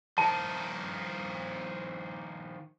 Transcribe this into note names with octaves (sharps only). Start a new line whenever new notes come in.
D#3 F3 A5